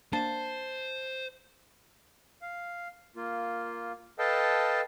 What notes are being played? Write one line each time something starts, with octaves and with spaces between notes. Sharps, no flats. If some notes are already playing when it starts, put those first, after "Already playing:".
A#3 D4 C5 A5
F5
A#3 F4
A4 B4 D#5 F5 G5 A5